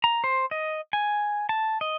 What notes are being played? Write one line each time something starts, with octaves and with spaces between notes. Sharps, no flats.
A#5
C5
D#5
G#5
A5
D#5